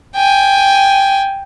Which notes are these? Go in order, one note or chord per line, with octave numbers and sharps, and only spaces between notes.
G5 G#5